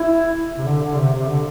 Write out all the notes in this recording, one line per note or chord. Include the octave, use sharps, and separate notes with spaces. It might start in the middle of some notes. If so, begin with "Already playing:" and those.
Already playing: E4
C3
D3
D3
C3
C3
D3